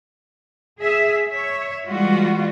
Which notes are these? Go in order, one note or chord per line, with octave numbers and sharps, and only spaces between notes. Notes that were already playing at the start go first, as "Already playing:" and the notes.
G#4 E5
C#5 E5
E3 G3 G#3 B3 F4 F#4